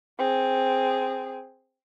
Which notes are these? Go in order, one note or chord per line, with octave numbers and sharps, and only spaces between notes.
C4 G#4